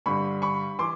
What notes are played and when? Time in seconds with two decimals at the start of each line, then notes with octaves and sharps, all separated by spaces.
0.06 G2 D3 G3 B5 C#6
0.42 B5 C#6
0.79 E3 C6 D6